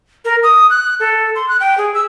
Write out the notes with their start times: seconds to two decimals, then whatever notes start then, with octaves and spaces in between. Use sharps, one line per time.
0.25 A#4
0.43 D#6
0.70 F#6
1.00 A4
1.35 C6
1.48 F#6
1.60 G5
1.78 G#4
1.94 E6